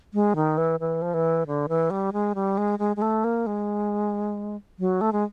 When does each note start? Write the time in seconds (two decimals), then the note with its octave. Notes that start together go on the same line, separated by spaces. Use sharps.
0.14 G#3
0.36 D#3
0.58 E3
0.80 E3
1.02 F3
1.14 E3
1.47 D3
1.69 E3
1.90 G3
2.13 G#3
2.35 G3
2.58 G#3
2.79 G#3
2.96 G#3
3.02 A3
3.24 A#3
3.47 G#3
4.79 F#3
5.01 A3
5.12 G#3